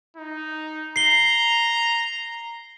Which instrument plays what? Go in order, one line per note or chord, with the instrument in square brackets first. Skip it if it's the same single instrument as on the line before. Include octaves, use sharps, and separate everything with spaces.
[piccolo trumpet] D#4
[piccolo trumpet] A#5 [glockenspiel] C7 G7